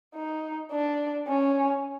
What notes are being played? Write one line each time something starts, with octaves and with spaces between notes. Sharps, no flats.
D#4
D4
C#4